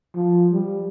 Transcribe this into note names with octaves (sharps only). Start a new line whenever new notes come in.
F3
G3